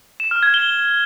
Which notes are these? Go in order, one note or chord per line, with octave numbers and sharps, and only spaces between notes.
E7
F6
G#6
G7